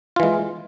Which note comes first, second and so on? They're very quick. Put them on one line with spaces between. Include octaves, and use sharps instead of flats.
F4 E3 G#3